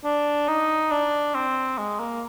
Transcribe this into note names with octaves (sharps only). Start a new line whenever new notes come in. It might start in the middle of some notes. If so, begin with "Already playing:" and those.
D4
D#4
D4
C4
G#3
A#3